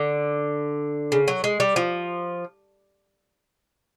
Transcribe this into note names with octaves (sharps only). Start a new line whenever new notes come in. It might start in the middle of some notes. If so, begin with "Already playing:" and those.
Already playing: D3
C#3
F#3
G#3
G3
F3